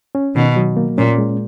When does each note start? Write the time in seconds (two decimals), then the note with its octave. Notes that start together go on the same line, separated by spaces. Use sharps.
0.15 C#4
0.35 B2 D#3
0.56 F#3
0.77 A#3
0.98 A#2 C#4
1.18 G#3